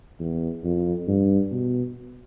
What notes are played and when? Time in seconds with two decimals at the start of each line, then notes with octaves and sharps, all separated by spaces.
0.19 E2
0.64 F2
1.08 G2
1.52 B2